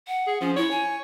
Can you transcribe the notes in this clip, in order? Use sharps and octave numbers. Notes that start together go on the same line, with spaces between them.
F#5
G#4
F3 C#4
E4 C#5
G#5